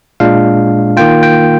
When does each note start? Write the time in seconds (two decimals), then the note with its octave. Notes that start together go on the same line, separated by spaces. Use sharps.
0.20 A#2 G#3 D4 F4 F5
0.97 D#3 A#3 F4 G5
1.23 G5